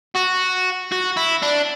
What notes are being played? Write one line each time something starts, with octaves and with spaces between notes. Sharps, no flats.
F#4
F#4
E4
D4